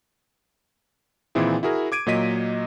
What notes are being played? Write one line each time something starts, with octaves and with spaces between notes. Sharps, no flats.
A#2 D#3 E3 C4 E4 G#4
E4 F#4 G#4 A#4
D6 G#6 D7 D#7
A#2 F#3 A#3 D#5 B6 D#7